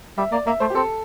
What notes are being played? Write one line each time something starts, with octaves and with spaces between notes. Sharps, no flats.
G3 E5
A#3 D5
A#3 E5
A3 C5
G4
C4 A4